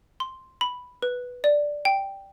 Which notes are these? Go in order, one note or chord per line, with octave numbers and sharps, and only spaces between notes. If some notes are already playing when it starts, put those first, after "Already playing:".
C6
B5
B4
D5
G5